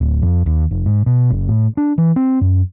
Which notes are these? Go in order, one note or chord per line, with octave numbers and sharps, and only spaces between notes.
D1
F2
D#2
F1
G#2
B2
F#1
A2
D4
E3
C4
F#2